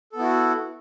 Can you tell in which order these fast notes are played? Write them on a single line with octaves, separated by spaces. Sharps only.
A4 B3 E4 F#4